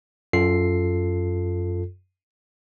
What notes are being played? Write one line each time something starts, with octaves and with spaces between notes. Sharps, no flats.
F#2 F4 A4 C7